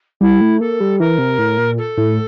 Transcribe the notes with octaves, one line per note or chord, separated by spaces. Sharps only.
G3 E4
A3
A#3 A4
G3
E3 A#4
C3
A2
A#2
A4
A2